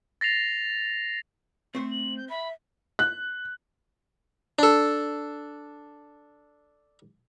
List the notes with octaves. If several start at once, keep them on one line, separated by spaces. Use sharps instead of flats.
A6 A#6 C7 F7
A3 C4 C5 C#6
F#7
G6
E5 B5
F#6
D4 A4